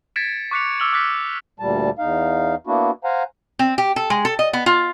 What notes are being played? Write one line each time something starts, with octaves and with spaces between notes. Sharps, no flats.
G#6 A6 B6 C#7 D7 E7
C#6 D6 F#6 B6 C#7 F7
D6 E6 F6 F7 F#7
D6 F6 F#6 A6 B6
D2 A#2 G3 A5
E2 D#4 F5
A#3 B3 D4 E4 F#4
C5 F5 F#5 G#5 A#5
C4
G4
A4
G#3
A4
D#5
B3
F4